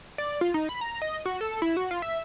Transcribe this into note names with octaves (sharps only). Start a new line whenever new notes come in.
D5
F4
D#4
B5
A#5
D#5
F#4
A4
E4
F#4
F4
E5